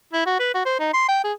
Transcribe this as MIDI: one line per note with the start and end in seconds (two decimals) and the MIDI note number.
0.13 0.23 64
0.26 0.38 66
0.40 0.52 71
0.54 0.63 66
0.66 0.79 72
0.79 0.90 63
0.93 1.07 84
1.08 1.19 79
1.24 1.33 68